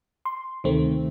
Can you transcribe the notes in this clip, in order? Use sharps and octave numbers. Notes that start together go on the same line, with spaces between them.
C6
D2 C3 D#3 A3 C4